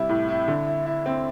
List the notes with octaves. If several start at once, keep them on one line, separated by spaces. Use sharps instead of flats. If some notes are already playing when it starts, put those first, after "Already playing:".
Already playing: C3 G3 E4
A2
E4
D3
E4
E4
C4